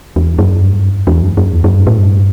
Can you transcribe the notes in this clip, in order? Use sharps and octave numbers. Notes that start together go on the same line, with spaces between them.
E2
F#2
G2
E2
F#2
F#2
E2
F#2
G2
A2
G2